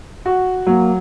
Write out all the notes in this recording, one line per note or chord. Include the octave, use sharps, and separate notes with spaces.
F#4
F#3 A#3